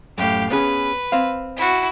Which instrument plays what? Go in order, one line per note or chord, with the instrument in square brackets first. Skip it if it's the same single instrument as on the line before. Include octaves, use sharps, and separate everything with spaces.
[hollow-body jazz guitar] F#2 A2 [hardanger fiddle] G4 F5
[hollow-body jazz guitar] B3 C#4 G#4 [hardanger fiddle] B4
[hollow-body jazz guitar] C4 F5
[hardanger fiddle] E4 F#4